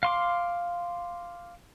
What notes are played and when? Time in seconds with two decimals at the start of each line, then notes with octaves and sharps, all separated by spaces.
0.03 F5 C6 D6